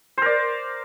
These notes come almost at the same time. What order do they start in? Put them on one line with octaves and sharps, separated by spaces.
C5 A#4 D5